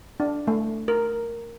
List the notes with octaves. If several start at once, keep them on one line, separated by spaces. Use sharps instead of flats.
D4
A3
A#4